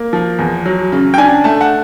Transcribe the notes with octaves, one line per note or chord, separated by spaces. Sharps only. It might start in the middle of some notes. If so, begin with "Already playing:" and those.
Already playing: A#3
F3
E2
F#3
C#3
G5
D4 G#5
A3 A5
F#5